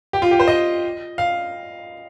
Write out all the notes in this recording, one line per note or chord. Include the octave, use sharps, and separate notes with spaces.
G4
F4
G4
C5
D#5
F5